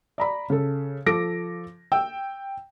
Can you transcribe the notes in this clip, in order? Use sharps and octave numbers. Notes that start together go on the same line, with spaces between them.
D5 A#5 B5
C#3 A4
F3 A4 D6 A#6 D7
G5 E6